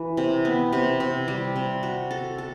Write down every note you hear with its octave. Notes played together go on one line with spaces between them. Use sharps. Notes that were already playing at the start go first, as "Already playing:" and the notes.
Already playing: E3
C3
B3
C3
C3
G3
C3
F#4
A4
A4